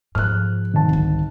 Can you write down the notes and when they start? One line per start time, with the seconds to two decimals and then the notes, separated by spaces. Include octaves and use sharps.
0.15 G#2 F3 F6 F#6
0.74 G#1 A5
0.89 C2 D3